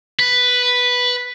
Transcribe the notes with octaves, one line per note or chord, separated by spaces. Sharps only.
B4